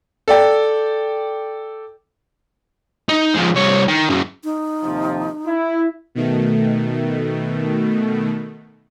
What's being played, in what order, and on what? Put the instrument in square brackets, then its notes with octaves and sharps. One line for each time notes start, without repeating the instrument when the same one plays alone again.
[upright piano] A4 D5 G5
[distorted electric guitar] D#4
F3 G#3
C2 C#5
D#3
F#2 C#3
[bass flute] D#4
[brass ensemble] D#2 C3 F3
E4
[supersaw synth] B2 D#3 A3